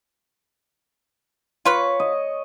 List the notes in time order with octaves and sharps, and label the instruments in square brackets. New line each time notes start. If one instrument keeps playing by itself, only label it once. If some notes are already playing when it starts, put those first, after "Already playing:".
[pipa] F4 B4 [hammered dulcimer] C#5
[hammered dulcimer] D#5